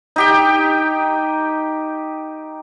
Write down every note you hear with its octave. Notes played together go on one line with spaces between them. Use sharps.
D#4 G4 G5